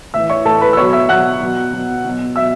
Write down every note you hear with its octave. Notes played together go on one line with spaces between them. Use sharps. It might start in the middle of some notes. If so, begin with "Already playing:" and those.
A2 E3 E5 E6
C#5 C#6
A2 E3 A4 A5
B4 B5
E6
B2 F#3 C#5 C#6
E5 E6
B2 F#3 F#5 F#6
B2 F#3
B2 F#3
B2 F#3
B2 F#3 E5 E6